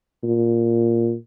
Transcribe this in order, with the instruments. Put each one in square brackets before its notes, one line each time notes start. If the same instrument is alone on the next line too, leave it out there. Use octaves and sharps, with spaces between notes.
[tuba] A#2